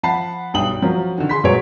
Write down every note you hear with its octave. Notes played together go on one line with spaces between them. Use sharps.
F3 F#5 A5 B5 C7
B1 G2 G5 D#6 F#7
F3 F#3 C#4 A#4
D3 D#3
G#4 C6 B6
A#1 F#3 G#3 C#5 D7